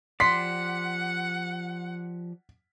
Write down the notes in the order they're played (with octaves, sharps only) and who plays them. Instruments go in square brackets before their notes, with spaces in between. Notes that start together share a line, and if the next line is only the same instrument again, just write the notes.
[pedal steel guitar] F3 G4 D5 [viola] F#5 [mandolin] C6 [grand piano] B6